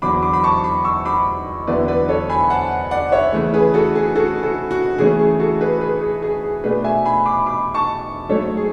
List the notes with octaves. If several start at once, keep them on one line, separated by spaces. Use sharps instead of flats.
E2 D3 F#3 B3 B5 D6
B5 D6
B5
A5 C#6
B5 D6
C#6 E6
B5 D6
E2 D3 F#3 B3 E4 B4 D5
B4 D5
A4 C#5
G#5 B5
F#5 A5
D5 F#5
C#5 E5
C#3 E3 A3
G#4 B4
F#4 A4
G#4
F#4 A4
F#4 A4
F#4
C#3 E3 A3 C#4 G#4
G#4
F#4 A4
G#4 B4
G#4 B4
G#4
G#4
G#4
B2 A3 D4 G#4 B4
E5 G#5
G#5 B5
B5 D6
B5 D6
A5 C#6
G#2 F#3 A3 A4 C#5
G#4